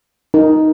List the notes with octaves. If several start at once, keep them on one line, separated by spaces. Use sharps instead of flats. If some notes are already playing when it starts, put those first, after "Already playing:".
D#4 A#4